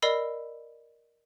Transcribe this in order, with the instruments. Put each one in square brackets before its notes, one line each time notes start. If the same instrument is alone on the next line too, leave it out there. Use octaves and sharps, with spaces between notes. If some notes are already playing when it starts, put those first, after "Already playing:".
[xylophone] A#4 D5 D#5 B5 E6 C7